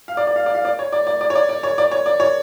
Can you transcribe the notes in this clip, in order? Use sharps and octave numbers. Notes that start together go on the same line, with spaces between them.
F5
D5
D5
F5
D5
F5
D5
C#5
D5
D5
D5
C#5
D5
D5
C#5
D5
C#5
D5
C#5